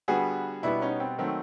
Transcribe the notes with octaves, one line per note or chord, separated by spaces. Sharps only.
D3 G3 B3 F#4 G#4
B2 G3 B3 D4 E4
C#4 D#4
C4
D#3 F#3 A3 C4